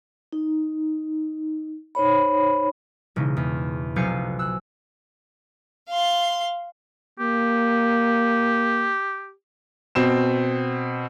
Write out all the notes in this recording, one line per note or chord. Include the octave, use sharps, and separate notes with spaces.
D#4
D#4 C5 C#5 B5
E1 C#3 D#4
E2
F1 B1 F5 G#5 G6 C#7
E6 F#6
F5 C6
A#3 G4
B2 C4 E7